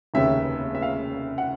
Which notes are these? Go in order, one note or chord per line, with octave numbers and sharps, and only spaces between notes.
F1 D#2 C#3 E5
E5
F5
F#5